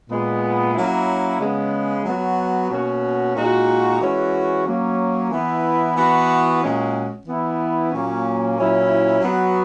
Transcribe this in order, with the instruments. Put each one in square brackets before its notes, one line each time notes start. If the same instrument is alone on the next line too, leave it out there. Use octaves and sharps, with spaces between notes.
[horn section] A#2 G#3 B3
F#3 A#3 C#4 E4
C#3 G#3 B3
F#3 B3 F#4
B2 A#3 C#4 F#4
A#2 G#3 D#4 F#4
E3 G#3 C#4 F#4
F#3 A#3 C#4
E3 B3 E4
E3 B3 F#4
A#2 G#3 C#4 F#4
E3 B3 E4
A#2 F#3 A#3 C#4
A#2 F#3 C#4 E4
F#3 B3 F#4